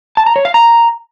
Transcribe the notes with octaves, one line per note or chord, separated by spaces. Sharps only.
A5
A#5
C#5
F5
A#5